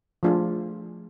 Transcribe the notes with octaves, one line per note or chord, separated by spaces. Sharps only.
F3 A3 D4 F4 G#4